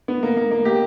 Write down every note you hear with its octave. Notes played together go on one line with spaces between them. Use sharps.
B3
A#3
A#3
A#3
G4